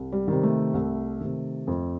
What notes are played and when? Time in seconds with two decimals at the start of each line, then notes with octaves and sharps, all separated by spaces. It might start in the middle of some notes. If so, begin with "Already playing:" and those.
Already playing: C2
0.12 G3
0.28 C3 D#3
0.43 A3
0.74 C2
1.21 C3 D#3
1.67 F2